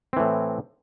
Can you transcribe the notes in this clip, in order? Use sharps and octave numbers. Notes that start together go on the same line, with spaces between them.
A2 E3 C4